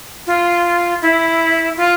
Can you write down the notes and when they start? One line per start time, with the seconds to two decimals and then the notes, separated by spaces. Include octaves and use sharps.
0.27 F4
1.02 E4
1.77 F4